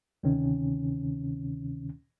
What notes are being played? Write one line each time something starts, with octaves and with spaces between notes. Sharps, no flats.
D2 C3 D#3 C#4